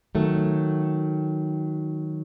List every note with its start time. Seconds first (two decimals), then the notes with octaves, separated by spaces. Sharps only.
0.15 D#3 F#3 A3